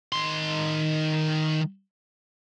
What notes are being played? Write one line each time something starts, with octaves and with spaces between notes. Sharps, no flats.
D#3 C6